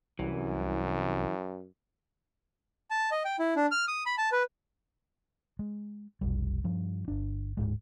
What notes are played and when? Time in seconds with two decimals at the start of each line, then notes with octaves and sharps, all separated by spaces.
0.19 C2 F#2 E3
2.91 A5
3.11 D#5
3.25 G5
3.39 E4
3.56 D4
3.71 F6
3.88 D#6
4.06 B5
4.18 A5
4.32 B4
5.59 G#3
6.21 F1 B1 G3
6.64 G2 F3
7.08 G1 D4
7.57 D1 B1 G#2 G#3